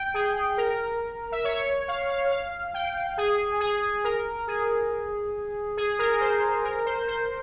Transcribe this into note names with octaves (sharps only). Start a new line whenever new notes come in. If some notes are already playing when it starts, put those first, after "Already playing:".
Already playing: G5
G#4
A#4
E5
C#5
F5
F5
F5
G5
G#4
G#4
A#4
G#4
G#4
A#4
C5
A#4
C5
C5